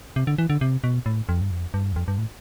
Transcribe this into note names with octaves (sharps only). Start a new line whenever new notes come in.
C3
D3
E3
D3
C3
B2
A2
F2
G2
F2
G2
E2
F2
G2
A2